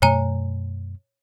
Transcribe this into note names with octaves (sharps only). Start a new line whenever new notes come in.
F#2 B2 A3 C#5 G#5 A#5